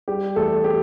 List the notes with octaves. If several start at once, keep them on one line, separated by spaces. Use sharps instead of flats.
G3 G4
E2 A3 A4
G4